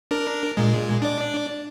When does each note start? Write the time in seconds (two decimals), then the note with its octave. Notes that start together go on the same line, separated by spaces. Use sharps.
0.11 D4 A#4
0.57 A#2 G#3
1.02 D4 D5